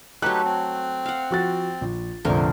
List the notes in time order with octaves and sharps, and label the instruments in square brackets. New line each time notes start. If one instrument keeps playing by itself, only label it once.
[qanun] F#3 A3 [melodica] D#4 G4 B4 [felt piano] F#6
[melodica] C4
[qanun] F5 F#5
[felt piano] F3 F#4 A6
A#1
[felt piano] F1 A#1 [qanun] D3 A#4 C5 [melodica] A3